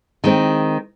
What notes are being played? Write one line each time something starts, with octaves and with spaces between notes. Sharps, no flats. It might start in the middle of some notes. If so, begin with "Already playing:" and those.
D#3 G#3 C4